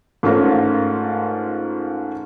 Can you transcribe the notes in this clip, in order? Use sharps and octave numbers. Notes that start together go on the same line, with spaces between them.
G#2 A3 C#4 F4 A#4